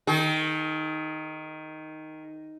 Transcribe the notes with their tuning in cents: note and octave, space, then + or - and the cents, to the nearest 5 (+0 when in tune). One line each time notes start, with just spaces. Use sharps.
D#3 +0 G#4 +40